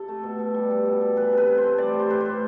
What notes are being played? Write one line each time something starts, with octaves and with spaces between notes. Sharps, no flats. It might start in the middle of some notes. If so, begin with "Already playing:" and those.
Already playing: C3 A4
A3
B2
B2
G3
G3
B2
B2
E3 B4
C3 B4
C3
C5
A3
G3 D5
G3
C5
A2 B4
A2 C5